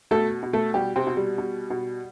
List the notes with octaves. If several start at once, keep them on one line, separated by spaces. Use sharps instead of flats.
B2 A3 A4
B2
A3 A4
B2 G3 G4
C3 C4
B2
G3
B2
B2